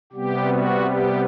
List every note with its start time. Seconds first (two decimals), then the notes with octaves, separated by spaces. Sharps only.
0.13 C3 G3 B3 G4
0.49 F#4
0.84 G4